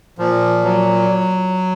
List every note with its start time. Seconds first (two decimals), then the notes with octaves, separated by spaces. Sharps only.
0.18 A#2 F3
0.63 F#3